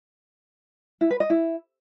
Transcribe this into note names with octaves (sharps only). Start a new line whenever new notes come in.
E4
B4
D#5
E4